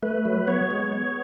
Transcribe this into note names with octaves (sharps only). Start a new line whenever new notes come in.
A3 B4
F#3
B3 C#5
G#3
B3